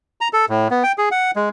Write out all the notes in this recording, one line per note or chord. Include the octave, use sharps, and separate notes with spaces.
A#5
A4
A2
B3
G5
G#4
F#5
G#3